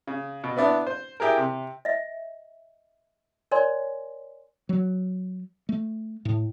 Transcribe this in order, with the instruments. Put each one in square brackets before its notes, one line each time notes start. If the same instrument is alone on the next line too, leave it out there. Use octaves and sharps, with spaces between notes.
[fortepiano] C#3
B2
B3 D4 E4 B4
C5
E4 G4 G#4 A#4
C3
[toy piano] D#5 E5
A#4 C#5 D5 G#5 C6
[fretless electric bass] F#3
A3
A2